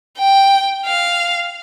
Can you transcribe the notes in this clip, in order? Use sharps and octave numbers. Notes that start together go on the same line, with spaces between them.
G5
F5